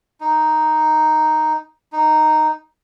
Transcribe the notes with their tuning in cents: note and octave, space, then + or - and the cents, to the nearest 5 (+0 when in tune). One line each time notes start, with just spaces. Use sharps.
D#4 +0
D#4 -5